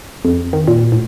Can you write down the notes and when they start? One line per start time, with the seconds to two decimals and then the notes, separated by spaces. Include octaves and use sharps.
0.25 F2
0.53 D#3
0.68 A#2
0.92 A2